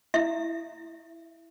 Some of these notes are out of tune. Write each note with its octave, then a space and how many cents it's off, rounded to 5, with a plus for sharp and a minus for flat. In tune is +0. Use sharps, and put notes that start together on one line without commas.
E4 +0 E5 +25